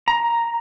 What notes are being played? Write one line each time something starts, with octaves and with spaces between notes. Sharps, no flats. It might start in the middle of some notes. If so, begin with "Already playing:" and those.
A#5